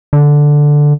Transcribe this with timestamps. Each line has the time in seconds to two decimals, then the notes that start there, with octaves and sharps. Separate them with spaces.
0.13 D3